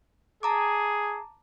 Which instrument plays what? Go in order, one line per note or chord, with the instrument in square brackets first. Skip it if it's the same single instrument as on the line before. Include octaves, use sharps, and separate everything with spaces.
[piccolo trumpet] G#4 [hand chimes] A5 A#5 D6